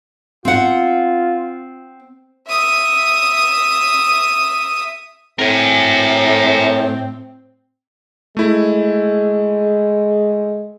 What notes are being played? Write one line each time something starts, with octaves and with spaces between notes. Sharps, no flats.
C4 F4 F#5
E5 D#6
A2 C4 A#4 G#5
G#3 A3 E4